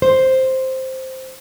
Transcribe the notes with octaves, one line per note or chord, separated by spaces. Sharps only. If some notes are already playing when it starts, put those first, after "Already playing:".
C5